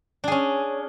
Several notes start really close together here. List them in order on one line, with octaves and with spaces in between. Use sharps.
D4 G#4 C#4